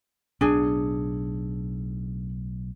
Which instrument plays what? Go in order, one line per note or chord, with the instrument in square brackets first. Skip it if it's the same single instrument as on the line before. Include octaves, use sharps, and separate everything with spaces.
[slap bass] B1 A2 [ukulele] D4 G#4